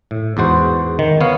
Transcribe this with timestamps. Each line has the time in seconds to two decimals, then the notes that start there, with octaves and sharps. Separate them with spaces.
0.11 A2
0.37 E2 G#2 F#4 C5
0.99 D#3
1.21 B3 C#5 F5